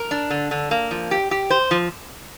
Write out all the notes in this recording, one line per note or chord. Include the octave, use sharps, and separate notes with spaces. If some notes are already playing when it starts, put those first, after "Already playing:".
Already playing: A#4
D4
D3
D3
A#3
F3
G4
G4
C5
F3